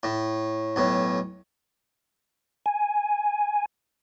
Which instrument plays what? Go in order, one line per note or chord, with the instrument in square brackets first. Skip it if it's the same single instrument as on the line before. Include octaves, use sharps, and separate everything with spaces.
[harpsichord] A2
B1 A2
[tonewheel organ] G#5